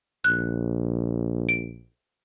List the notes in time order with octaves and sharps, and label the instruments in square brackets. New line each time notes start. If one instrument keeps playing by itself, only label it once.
[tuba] A#1 [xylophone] F#6
[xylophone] D7